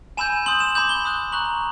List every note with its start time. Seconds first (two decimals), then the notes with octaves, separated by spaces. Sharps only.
0.17 G#5 B5 E6 G6 E7
0.46 C6 D#6 G6 F#7
0.60 E7
0.75 B5 D6 G6 F#7
0.89 G7
1.04 B5 D#6 F#6
1.32 A#5 C#6 F#6 F#7